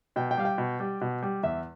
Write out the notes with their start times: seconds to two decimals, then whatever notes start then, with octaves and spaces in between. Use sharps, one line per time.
0.16 B2 G5
0.31 G5
0.38 G3 F5
0.45 G5
0.58 B2
0.80 G3
1.01 B2
1.22 G3
1.43 E2 E5